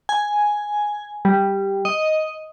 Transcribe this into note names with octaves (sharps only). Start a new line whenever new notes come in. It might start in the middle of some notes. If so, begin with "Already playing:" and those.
G#5
G3
D#5